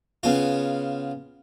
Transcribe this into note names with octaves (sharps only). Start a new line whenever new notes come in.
C#3 B3 F4